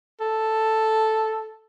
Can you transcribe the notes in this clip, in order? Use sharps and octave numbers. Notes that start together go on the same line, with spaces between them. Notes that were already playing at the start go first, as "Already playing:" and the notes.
A4